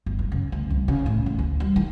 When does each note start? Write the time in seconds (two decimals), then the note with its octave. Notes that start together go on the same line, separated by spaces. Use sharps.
0.06 G1
0.19 G2
0.32 C#3
0.52 D2
0.70 C2
0.88 C#3
1.06 A2
1.26 D2
1.39 D2
1.60 G3
1.76 D#3